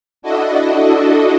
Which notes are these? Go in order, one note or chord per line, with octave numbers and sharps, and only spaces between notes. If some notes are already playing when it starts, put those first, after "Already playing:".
D4 E4 F#4 A4 D#5